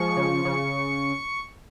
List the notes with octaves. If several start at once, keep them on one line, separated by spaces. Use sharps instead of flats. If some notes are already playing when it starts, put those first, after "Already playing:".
Already playing: F3 G#3 C#6
C#3
C#3